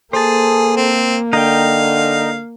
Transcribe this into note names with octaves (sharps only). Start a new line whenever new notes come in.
A#3 G#4 A4 C5 A5
C4
D3 D#4 F5 G5